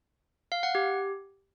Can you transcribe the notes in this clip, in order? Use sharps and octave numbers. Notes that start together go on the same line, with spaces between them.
F5
F#5
G4